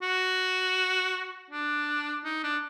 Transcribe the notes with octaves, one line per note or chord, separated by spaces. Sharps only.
F#4
D4
D#4
D4